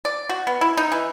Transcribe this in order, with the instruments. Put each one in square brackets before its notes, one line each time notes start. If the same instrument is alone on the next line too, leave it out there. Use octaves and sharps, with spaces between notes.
[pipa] D5
F#4
B3
E4
D#4
E3